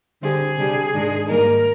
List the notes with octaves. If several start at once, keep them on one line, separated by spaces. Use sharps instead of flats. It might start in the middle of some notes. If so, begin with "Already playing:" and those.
D3 G3 C4 G#4
C3 G3 D4
G#2 D#3 G#3 D4
G#2 D#3 G3 A#3 D#4 A#4